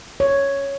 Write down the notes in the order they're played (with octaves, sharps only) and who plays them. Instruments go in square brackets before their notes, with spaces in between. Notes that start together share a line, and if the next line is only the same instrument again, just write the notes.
[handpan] C#5